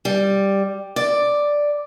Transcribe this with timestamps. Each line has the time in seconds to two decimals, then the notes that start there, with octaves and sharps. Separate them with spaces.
0.05 G3
0.96 D5